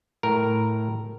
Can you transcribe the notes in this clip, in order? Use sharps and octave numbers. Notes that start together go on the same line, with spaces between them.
A2 A#4